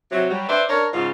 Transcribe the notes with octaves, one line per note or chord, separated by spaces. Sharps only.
C3 F#3
F#3 G3
B4 C5 D5 E5
D4 A#4 C#5
G#2 C#3 F4